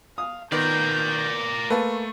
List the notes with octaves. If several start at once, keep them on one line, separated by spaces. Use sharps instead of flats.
F5 D#6
D#3 B3 A#4 D5 G6
A3 A#3 B4 A5 C#6